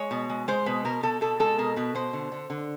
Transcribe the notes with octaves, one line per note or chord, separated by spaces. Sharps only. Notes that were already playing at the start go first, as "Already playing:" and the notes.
Already playing: G#3 C#5
B2
G#3
G#3 C5
B2 B4
B2 A#4
B2 A4
B2 A4
G#3 A4
B2 A#4
B2 B4
B2 C5
D3
D3
D3